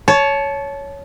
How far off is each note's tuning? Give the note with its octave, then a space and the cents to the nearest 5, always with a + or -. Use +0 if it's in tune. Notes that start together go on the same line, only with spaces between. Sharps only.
C#5 +10 A5 -20